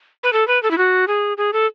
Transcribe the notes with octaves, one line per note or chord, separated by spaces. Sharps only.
B4
A4
B4
A4
E4
F#4
G#4
G#4
A4